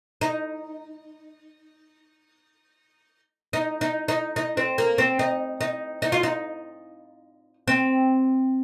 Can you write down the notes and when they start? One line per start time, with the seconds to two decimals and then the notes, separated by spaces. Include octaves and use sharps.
0.21 D#4
3.53 D#4
3.81 D#4
4.08 D#4
4.36 D#4
4.57 C4
4.78 A#3
4.98 C4
5.19 D#4
5.61 D#4
6.02 D#4
6.12 F4
6.23 D#4
7.68 C4